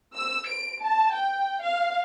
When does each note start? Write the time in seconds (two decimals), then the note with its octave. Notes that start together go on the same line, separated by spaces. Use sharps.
0.16 E6
0.48 D7
0.83 A5
1.14 G5
1.63 F5